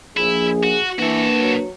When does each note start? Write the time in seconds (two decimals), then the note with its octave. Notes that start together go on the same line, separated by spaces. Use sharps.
0.17 A#1 E4 G#4
0.63 F#4
0.99 E3 A#3 D4 F#4 A4 B4
1.41 F#3